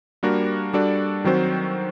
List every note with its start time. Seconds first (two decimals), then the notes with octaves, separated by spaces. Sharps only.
0.23 G3 A#3 D4 F#4 A#4
0.73 G3 D4 F#4 A4 D5
1.24 D#3 F#3 C4 F#4 C5